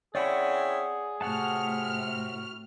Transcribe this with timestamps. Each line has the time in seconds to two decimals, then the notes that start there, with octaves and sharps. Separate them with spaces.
0.15 C4 C#4 E4 G#4 D5 F#5 B5
1.21 A2 C3 F#4 F#5 A5 F6